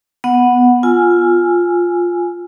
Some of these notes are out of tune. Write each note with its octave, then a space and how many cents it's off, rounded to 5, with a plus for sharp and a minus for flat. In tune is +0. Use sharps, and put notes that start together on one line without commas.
B3 +0 F#5 -5
F4 +5 G#5 +0 E6 +30